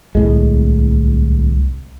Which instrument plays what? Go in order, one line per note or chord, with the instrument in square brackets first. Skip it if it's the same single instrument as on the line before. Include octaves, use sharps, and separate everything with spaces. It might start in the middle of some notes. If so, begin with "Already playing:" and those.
[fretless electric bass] D1 A2 G#3 [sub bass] C2